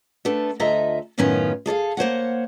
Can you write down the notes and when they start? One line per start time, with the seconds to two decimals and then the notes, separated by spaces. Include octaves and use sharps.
0.25 A3 B3 D4 A4
0.60 D2 F4 A4 D#5 E5 A#5
1.18 F#2 A2 D#3 B3 C#4 F4
1.66 G#4 A4 D5 F5
1.97 A#3 C5 C#5 F#5